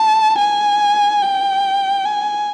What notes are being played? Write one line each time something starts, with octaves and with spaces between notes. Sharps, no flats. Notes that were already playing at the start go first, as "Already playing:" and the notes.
Already playing: A5
G#5
G5
G#5